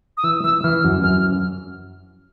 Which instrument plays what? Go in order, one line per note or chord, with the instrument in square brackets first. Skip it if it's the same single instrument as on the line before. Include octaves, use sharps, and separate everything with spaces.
[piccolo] D#6
[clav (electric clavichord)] E3 [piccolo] E6
[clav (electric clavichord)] E3 [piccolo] E6
[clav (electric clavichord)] E3 [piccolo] F6
[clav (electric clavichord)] F#2
[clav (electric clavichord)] F#2 [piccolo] F6